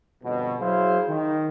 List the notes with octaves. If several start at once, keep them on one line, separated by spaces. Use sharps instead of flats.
G1 F2 B2
F#3 E4 G#4 C5 F5
D#3